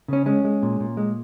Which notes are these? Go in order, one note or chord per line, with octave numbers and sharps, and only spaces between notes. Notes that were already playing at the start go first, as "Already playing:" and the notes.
C#3 C#4
G#3 C#4
G#3
A#2
A#2
G#3